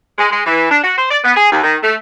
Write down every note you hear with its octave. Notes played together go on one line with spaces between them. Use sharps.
G#3
G#3
E3
D4
F#4
C5
D5
B3
G#4
D#2
D#3
A3